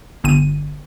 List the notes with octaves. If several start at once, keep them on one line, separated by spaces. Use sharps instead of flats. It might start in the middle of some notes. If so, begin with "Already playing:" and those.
G1 D#7